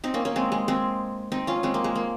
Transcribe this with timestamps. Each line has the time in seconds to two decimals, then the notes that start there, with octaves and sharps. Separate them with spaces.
0.04 C4 D#4
0.14 A#3 C#4
0.25 A#3 C#4
0.36 G#3 C4
0.52 G#3
0.68 G#3 C4
1.32 C4 D#4
1.47 C#4 F4
1.63 G#3 C4
1.74 A#3
1.84 G#3
1.95 A#3